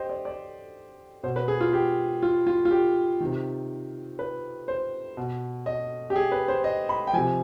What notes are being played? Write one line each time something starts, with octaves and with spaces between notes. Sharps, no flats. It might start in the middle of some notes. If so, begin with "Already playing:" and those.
Already playing: G4 C5 D#5
D5
D5
B2 C5
B4
G#4
F4
G4
F4
F4
F4
G4
C3 D#3
B4
C5
B2
D#5
G4
G#4
B4
C5
D#5
B5
G5
C3 F3 G#5